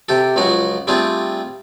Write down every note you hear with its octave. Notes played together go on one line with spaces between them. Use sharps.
C3 G4 A4
C#2 C#3 F3 F#3 F#4 F#5
G3 A3 C4 D4 F4 G#4